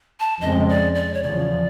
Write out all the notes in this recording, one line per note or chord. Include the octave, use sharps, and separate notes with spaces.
A5
F2 C#3 F3 G#3 C4 D#5
D5
D5
C#5
E2 C#3 F3 D5